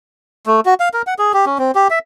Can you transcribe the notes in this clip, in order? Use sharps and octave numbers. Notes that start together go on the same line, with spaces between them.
A3
F#4
F5
A#4
F#5
G#4
G4
C#4
C4
G4
E5